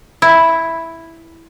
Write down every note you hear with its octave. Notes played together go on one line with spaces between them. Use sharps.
E4